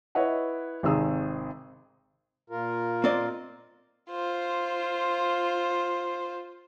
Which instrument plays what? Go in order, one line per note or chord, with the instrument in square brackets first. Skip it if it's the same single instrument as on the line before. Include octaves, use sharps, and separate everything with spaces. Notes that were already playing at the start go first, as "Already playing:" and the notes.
[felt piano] E4 B4 C#5 D#5 F#5
G#1 C3 D#3 G#4 E6
[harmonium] A#2 F4 A#4
[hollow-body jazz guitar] C4 D5 D#5
[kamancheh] F4 C5